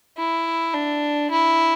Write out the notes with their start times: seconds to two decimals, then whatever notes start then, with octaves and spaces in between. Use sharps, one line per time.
0.18 E4
0.74 D4
1.31 E4